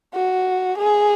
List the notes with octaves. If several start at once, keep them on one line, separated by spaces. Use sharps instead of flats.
F#4
G#4